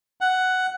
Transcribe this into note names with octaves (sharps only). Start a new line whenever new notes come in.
F#5